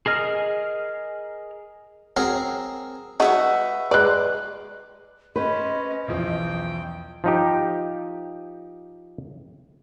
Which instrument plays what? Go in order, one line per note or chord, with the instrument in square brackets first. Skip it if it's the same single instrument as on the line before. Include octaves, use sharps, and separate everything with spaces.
[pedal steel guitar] G#4 A#4 D#5 F6
[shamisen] F#3 [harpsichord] C4 G#4 A#4
[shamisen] G#3 F#4 [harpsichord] D#4 [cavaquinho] B4 E5 F#5
[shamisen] G#3 D5 [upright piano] B4 F#6
[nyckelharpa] C#4 [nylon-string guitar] B4 C5 [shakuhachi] D#5
[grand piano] B1 E2 F3 [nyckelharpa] G5
[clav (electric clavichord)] F3 D#4 G4